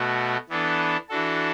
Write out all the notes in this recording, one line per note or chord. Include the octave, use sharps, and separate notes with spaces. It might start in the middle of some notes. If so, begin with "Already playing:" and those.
Already playing: B2 A3 F#4
E3 B3 D4 A4
E3 D4 F#4 A4